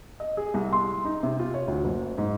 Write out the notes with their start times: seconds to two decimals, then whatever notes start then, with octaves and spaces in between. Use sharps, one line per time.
0.20 D#5
0.37 G#4
0.54 C2
0.73 C6
1.05 D#4
1.23 C3
1.39 F4
1.54 C#5
1.68 D2
1.84 F#1
2.18 G#2